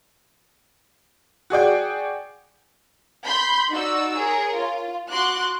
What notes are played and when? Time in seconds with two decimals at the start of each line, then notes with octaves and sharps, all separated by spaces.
1.50 F#4 G#4 D5 G5
3.25 B5 C6 G6
3.70 D#4 F#4 D5 E6
4.15 G#4 A#4 C#5
4.54 F4
5.11 F#4 C6 D6 F#6